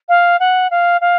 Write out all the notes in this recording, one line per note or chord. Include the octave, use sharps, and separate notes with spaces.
F5
F#5
F5
F5